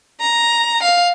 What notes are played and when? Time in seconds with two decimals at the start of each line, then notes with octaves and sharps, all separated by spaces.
0.21 A#5
0.82 F5